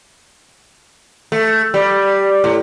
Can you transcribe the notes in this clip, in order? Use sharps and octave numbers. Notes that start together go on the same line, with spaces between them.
A3
G3
A2